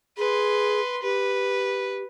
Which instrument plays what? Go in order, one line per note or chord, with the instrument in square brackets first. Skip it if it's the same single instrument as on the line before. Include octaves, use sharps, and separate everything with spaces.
[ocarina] G#4 [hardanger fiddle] B4 C6
[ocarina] G4 [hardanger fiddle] B4